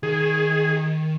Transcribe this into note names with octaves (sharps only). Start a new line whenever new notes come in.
D#3 G#4